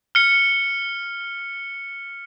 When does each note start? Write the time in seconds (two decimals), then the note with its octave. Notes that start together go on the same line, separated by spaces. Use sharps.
0.15 F6 C#7